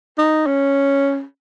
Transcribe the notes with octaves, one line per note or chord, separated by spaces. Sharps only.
D#4
C#4